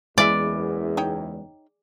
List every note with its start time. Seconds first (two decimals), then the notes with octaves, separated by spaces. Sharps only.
0.18 F#1 E2 E3 G#3 E4 D5 E5
0.97 D#4 C#5 G5